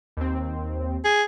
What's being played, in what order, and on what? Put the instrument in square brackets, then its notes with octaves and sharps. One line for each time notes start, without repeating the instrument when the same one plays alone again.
[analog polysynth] D#2 C4
[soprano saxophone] G#4